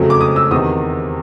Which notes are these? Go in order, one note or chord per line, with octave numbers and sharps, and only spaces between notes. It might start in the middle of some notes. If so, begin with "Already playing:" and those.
Already playing: F2 C#3 F#3 A3
D6
D#6
E6
E2 C3 D#3 D#6